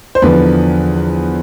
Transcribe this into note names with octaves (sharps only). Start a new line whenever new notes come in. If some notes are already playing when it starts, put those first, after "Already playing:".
C5
E2 D3 F3 B4